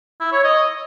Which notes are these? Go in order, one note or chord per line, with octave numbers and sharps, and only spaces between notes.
E4
C#5
D#5